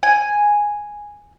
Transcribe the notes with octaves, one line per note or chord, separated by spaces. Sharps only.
G#5